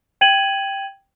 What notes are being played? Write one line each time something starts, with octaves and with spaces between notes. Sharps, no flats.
G5 G#6 D#7 F#7